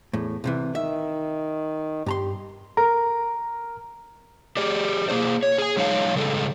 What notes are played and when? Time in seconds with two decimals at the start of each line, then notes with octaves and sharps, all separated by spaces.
0.13 E2 A2
0.44 C2 C3 E3
0.75 D#3 E5
2.06 G2 G4 A#5 C6
2.77 A#4 A#5
4.57 G4 G#4 D5
5.09 A#3 G#4 C5
5.43 C#5
5.58 G#4 G#5
5.77 F#3 G#3 D4 D#4 C#5 F5
6.16 C#3 G3 G#3 A4